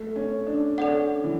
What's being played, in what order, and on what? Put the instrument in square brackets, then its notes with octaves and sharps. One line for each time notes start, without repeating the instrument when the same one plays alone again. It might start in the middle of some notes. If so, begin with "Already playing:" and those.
Already playing: [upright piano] A3
C#4
D4
[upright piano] C#4 [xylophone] A4 D5 F#5
[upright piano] E3